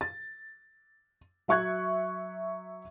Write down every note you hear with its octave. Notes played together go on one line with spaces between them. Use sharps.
A6
F#3 E5 C#6 F#6 G#6